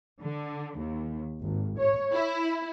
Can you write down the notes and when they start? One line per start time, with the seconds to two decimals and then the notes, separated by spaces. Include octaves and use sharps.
0.21 D3
0.78 D#2
1.40 G#1
1.77 C#5
2.14 E4